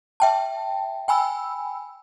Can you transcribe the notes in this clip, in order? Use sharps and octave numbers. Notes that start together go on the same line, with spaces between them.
E5 G5 A5
G5 G#5 B5 E6